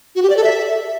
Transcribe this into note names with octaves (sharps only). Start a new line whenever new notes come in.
F#4
G4
D5
A4
E5